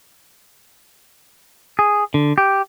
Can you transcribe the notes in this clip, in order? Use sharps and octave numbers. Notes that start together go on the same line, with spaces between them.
G#4
D3
G4